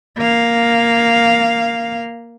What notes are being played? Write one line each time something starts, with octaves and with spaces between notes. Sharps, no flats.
A#3 F5